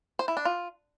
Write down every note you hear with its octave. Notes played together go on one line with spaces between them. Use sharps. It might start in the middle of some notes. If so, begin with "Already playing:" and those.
C5
E4
D4
F4